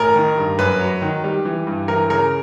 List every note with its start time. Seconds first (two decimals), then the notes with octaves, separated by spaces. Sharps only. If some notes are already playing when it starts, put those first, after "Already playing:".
Already playing: A1 A#4
0.16 D#3
0.37 G2
0.59 F#2 B4
0.80 F#3
1.02 D#3
1.24 G3
1.45 E3
1.67 G2
1.88 E3 A#4
2.10 C#3 A#4